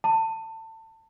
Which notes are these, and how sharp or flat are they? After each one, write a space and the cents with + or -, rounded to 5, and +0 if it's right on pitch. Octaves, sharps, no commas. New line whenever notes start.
A5 +25